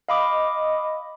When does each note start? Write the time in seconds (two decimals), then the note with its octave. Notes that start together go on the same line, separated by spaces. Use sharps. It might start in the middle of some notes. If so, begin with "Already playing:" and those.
0.08 D#5 F5 B5 D6